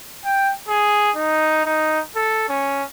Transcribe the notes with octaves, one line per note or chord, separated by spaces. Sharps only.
G5
G#4
D#4
D#4
A4
C#4